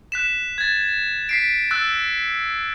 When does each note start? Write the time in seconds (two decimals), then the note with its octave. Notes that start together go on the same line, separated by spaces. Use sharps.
0.12 F#6 B6 E7
0.58 G#6 A6
1.29 B6 C7 D7
1.71 E6 F#6 A6